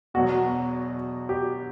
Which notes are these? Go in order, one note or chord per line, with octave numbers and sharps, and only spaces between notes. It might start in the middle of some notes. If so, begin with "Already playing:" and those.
E2 B2 F#3 F#4
G4